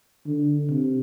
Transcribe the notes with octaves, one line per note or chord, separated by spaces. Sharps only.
D3
C3